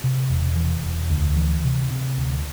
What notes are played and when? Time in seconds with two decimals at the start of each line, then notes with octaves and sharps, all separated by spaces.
0.04 C3
0.30 E1
0.56 E3
0.84 E1
1.10 D2
1.36 E3
1.64 C3
1.91 C3
2.17 D2